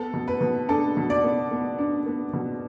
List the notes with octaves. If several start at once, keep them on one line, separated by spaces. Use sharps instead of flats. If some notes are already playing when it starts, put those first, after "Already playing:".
Already playing: B3 A4
B2
B4
B2
D4 A4
B2
D5
B3
B3
D4
B3
B2